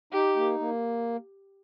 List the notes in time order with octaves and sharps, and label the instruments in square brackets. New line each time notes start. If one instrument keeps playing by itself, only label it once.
[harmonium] D#4 [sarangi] G4
[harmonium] A#3
A#3